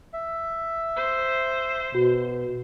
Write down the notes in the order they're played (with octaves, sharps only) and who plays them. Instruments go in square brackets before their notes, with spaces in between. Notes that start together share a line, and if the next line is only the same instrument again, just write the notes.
[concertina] E5
[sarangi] C5
[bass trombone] B2 [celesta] F#4